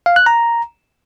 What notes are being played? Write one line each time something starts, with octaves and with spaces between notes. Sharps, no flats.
F5
F#6
A#5